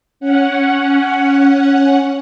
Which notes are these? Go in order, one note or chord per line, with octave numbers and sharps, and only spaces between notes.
C#4 F#5